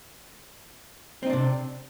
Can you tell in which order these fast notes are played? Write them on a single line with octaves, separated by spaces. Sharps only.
C4 D#4 D4 C3